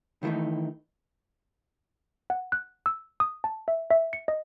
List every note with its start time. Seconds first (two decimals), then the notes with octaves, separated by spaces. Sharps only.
0.23 D#3 E3 G3 A3 D#4
2.30 F#5
2.52 F#6
2.86 E6
3.20 D#6
3.44 A5
3.68 E5
3.91 E5
4.13 C#7
4.28 D#5